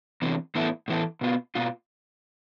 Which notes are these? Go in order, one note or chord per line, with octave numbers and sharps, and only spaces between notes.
E2 C3 E3
A2 E3 B3 E4 A4
A2 E3 B3 E4 A4
B2 B3 F4
B2 B3 F4